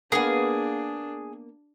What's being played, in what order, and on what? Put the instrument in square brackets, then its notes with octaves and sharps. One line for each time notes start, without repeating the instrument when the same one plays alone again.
[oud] A#3 B3 [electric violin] D4 [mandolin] G#4